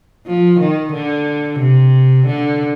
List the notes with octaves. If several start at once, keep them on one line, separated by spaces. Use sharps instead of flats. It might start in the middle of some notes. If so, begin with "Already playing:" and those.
F3
D#3
D3
C3
D3